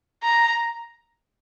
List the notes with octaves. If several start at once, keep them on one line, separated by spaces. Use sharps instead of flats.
A#5